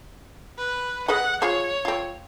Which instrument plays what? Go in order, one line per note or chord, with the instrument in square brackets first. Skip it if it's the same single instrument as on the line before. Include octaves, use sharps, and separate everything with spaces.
[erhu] B4
[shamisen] G#4 B4 D#5 [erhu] F#5
[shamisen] F4 G#4 C5 [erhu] C#5
[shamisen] C4 F4